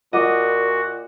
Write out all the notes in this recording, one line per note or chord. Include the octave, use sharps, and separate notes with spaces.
A#2 F4 F#4 D#5 F#5 D6